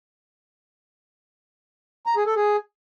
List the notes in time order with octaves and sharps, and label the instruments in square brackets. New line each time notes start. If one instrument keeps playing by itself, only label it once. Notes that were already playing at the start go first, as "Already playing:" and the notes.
[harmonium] A#5
G#4
A4
G#4